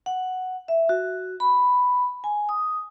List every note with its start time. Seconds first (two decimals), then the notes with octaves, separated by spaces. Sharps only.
0.06 F#5
0.68 E5
0.89 F#4
1.40 B5
2.24 G#5
2.49 D#6